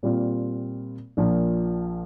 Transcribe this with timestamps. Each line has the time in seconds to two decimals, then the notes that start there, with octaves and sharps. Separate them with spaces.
0.03 A#2 G3 C4 F4
1.17 A#1 A#2 F3